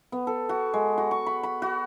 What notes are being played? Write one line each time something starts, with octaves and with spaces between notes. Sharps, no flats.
B3
A4
F#4
G#3
F#4
C#6
B5
B5
F#4